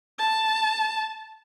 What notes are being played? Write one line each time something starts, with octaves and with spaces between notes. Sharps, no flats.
A5